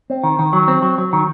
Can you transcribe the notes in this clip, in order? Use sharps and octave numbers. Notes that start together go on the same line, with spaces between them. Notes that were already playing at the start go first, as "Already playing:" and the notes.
C4
D#3
D#3
F#3
C4
F#3
F#3
D#3